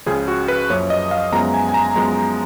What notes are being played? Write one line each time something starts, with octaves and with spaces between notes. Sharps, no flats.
C#2 C#3 F3 G#4
F#4
B4
F#2 F3 A#3 C#5
D#5
F5
F#2 F3 G#3 B3 A#5
G#5
G#5
A#5
F#2 F3 G#3 B3